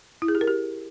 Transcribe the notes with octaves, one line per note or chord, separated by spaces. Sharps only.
E4
G#4
G4
A#4
G4